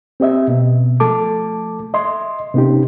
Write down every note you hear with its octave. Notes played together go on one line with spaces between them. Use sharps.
C4 G4 D#5 E5
B2 B3
F3 A3 A4 A5 D6
D#5 E5 C6
C3 B3 C#4 D#4 G4